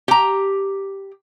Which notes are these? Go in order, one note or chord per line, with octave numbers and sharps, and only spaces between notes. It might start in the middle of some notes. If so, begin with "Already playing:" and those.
G4 A#5